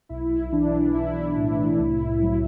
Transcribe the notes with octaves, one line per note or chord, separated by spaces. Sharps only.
B1 E4
E3 D4
B1 E4
A2
C2
F#3